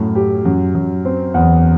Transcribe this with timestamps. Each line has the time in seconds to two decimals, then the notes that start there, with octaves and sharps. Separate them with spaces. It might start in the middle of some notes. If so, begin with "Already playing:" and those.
Already playing: F#2 A2
0.15 G4
0.45 F#2
0.75 F#2
1.05 C4
1.34 E2